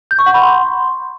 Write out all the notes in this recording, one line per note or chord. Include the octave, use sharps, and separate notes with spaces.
G6
C#6
F#5
B5
C6